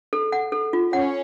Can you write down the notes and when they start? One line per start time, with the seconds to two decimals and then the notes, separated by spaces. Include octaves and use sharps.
0.13 A4
0.32 F#5
0.52 A4
0.73 F4
0.93 C#4 F#5